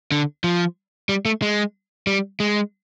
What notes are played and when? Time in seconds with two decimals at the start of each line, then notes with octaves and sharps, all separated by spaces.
0.12 D3
0.44 F3
1.09 G3
1.25 A3
1.42 G#3
2.07 G3
2.40 G#3